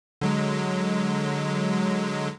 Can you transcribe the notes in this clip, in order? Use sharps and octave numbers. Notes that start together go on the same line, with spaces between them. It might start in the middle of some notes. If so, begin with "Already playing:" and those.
D3 F#3 G#3